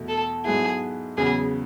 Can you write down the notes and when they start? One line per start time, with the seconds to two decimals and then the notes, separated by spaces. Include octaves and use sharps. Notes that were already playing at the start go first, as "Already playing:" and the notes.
Already playing: E2 B2 A3
0.08 A4
0.44 G#2 F#3 B3 E4 G#4
1.17 E2 C#3 F#3 B3 G#4